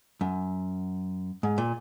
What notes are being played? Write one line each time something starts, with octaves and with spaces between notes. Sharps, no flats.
F#2
G#2
A#2